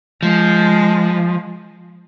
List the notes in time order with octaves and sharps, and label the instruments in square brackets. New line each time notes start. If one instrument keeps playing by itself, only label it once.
[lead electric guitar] F3 [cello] G#3